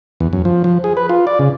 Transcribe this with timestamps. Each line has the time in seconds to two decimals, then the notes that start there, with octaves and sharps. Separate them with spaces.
0.20 E2
0.33 F#2
0.45 F3
0.64 F3
0.84 G#4
0.97 B4
1.09 F4
1.27 D5
1.39 C#3